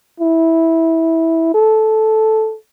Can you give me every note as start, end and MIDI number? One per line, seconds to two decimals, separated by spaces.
0.20 1.50 64
1.54 2.56 69